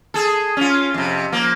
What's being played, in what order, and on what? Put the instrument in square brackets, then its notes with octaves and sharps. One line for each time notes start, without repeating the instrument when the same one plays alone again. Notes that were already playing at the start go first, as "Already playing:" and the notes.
[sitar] G#4 A4
C#4 F4
F2 C3
F3 A#3